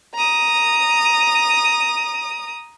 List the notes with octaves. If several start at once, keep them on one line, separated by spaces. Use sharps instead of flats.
A#5 D#6